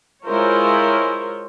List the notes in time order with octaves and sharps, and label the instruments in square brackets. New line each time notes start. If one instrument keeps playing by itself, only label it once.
[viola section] G#3 E4 F4 A#4 C5 C#5